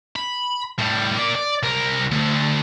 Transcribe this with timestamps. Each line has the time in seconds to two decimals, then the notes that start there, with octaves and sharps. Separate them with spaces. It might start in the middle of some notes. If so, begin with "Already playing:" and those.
0.16 B5
0.79 A2 G3
1.16 A#3 D5
1.35 D5
1.63 C2 A#4
2.12 D2 D3